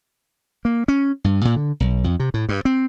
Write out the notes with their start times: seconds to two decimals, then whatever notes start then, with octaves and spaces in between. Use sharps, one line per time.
0.65 A#3
0.88 C#4
1.24 G2
1.45 A#2
1.56 D3
1.80 B1
2.04 F2
2.20 C3
2.34 A2
2.49 G2
2.65 C4